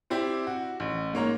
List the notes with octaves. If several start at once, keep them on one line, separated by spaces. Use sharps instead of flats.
C4 E4 G4 D5
F#4
A1
G#2 A#3 C#5 A#5